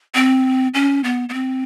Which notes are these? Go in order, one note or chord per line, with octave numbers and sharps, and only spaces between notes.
C4
C#4
B3
B3
C4